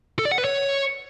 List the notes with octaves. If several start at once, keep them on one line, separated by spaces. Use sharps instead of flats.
A4
D5
F#5
B4
C#5